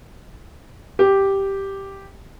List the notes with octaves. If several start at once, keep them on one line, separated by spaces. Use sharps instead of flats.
G4